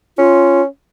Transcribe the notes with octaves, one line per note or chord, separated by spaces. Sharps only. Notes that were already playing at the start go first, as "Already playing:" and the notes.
C#4 F4